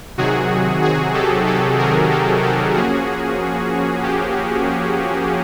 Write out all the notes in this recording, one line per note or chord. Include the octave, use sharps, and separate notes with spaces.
C3 D#3 F#3 F#4 G#4
F#4 G#4
G4 A4
G4 A4
G#4 A#4
G4 A4
G4 A4
F3 A#3 C#4 F#4 G#4
G4